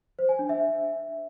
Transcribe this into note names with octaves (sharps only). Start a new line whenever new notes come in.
C5
G#5
D4
E5